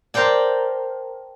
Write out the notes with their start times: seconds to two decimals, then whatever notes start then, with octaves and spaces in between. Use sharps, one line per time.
0.14 A#4 C5 D5 G5 A5